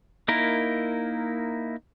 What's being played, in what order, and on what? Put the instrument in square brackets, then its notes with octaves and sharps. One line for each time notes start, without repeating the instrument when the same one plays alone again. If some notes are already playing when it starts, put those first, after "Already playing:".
[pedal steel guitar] A#3 D#4 E4 A#4